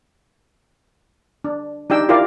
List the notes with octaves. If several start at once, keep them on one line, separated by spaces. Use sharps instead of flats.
D4
D4 D#4 G4 G5 E6
E4 F4 G4 A#4 D5 F5